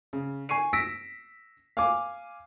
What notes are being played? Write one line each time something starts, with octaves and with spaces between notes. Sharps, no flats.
C#3
G#5 C#6 C7 D#7
E6 A#6 B6 D7
F5 G#5 D6